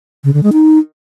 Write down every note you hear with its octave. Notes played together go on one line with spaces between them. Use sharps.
C#3
D3
G#3
D#4